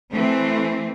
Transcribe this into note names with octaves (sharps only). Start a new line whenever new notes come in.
E3 A3 C4